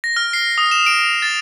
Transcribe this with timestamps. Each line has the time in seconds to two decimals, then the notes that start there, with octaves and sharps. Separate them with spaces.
0.04 A#6
0.16 F6
0.33 C7
0.58 D#6
0.71 E7
0.86 D7
1.22 A6